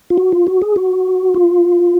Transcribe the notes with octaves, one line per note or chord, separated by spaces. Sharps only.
F4
F#4
F4
F#4
G#4
F#4
F4